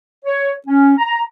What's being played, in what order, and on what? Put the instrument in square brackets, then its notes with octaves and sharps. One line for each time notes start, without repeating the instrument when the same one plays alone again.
[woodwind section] C#5
C#4
A#5